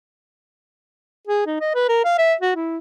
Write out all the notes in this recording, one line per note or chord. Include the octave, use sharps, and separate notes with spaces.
G#4
D#4
D#5
B4
A#4
F5
E5
F#4
E4